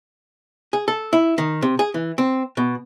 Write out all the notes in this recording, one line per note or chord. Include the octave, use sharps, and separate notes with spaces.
G#4
A4
E4
D#3
C3
G#4
E3
C4
B2